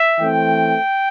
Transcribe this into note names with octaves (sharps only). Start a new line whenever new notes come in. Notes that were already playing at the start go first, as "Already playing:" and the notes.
Already playing: E5
E3 A3 C4 G5